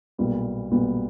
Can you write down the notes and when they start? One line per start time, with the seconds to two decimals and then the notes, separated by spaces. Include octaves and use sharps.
0.18 B1 A#2 G3 B3
0.71 B1 A#2 G3 B3